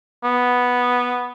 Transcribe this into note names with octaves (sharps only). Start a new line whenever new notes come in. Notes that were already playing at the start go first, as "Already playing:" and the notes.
B3